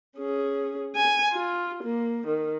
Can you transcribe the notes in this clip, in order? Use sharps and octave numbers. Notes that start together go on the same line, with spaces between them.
C#4 G#4
G#5
F4
A#3
D#3